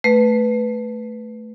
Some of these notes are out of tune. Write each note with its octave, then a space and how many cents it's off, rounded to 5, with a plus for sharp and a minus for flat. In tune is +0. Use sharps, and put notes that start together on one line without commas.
A3 +0 B4 +0